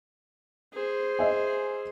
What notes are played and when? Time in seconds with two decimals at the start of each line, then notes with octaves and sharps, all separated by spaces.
0.73 G#4 C5
1.19 D#5 E5 G#5